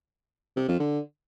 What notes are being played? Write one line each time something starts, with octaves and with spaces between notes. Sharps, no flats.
C3
F2
D3